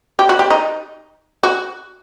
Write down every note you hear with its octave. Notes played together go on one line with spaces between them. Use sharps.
G4
F#4
G4
D#4
F#4